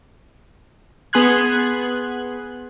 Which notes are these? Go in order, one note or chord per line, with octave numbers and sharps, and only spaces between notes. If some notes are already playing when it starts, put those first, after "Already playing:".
B3 G#4 C6 F#6 G#6